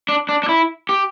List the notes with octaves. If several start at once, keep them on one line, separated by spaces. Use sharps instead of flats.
D4
D4
D4
E4
G4